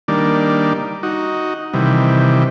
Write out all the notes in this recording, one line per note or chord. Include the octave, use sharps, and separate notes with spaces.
D#3 G3 A#3 D4
D#4 F#4
C3 D#3 E3 G3